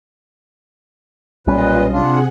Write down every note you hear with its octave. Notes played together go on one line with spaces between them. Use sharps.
B1 A#2 G3 C#4 F4 B4 D#5
C3 D4 F4 G#4 F#5